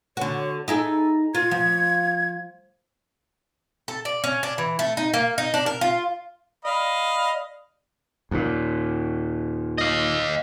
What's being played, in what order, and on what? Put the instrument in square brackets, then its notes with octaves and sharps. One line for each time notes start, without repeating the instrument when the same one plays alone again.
[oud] D3 F#4 [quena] C#5
[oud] D#4 E4 G#4 [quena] A4
[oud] F4 [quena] G#6
[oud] F3
[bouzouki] A4
D5
C#4
D4
E3
A3
D#4
A#3
D#4
D4
A#4
F4
[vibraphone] D5 [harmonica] D#5 F5 B5
[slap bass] D#2 A#2
[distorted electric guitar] D#5 F5